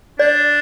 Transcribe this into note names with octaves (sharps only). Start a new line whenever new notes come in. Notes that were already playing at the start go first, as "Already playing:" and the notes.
D4 D5